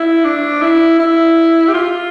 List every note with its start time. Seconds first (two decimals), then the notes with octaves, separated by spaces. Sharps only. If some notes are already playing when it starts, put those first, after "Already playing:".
Already playing: E4
0.25 D4
0.62 E4
0.99 E4
1.68 G4
1.74 F4